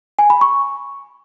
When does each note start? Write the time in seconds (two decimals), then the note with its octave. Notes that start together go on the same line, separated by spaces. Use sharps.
0.19 G#5
0.30 B5
0.41 C#6